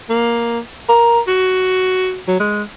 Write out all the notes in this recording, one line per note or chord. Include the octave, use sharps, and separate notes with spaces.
A#3
A#4
F#4
F#3
G#3